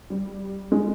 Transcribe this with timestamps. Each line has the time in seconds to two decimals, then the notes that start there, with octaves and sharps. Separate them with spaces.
0.10 G3
0.72 G#3